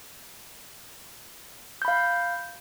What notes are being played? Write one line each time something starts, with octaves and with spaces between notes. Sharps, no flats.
F5 B5 G6